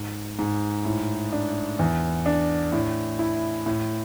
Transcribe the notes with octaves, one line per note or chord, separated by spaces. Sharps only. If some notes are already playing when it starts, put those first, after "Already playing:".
Already playing: G#2
G#2
A2
D4
E2
D4
A2
E4
A2